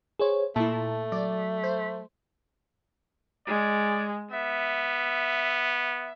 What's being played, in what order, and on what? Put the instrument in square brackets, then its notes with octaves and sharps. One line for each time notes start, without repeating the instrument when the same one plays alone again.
[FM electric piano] G#4 C5 C#5
[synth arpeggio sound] A#2 E4 [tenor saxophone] A3 [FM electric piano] A5
[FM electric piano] F#3 [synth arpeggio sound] D5
[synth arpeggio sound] C5
[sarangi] G#3 [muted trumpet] D5
[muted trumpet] B3 [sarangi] E5